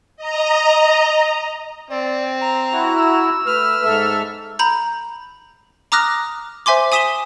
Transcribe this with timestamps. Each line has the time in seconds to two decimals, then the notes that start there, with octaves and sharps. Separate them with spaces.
0.17 D#5 A#5
1.90 C4 D5
2.41 A#5
2.73 E4 F#4
2.97 E6
3.47 A3 B4 F6
3.85 G#2 A4 E5
4.59 A#5 B5 G6
5.92 A#5 D6 D#6 F6 F#6 A#6
6.66 C5 E5 G#5 C6 D6
6.92 G#5 D#6 B6 D#7 E7 G7